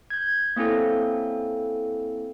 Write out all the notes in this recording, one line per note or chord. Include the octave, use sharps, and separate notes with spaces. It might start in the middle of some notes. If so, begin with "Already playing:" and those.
G6 G#6
A#3 C4 C#4 E4 A4